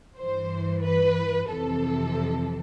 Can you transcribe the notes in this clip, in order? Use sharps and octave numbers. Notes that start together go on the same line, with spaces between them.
G2 E3 C5
B4
F2 C3 E3 A4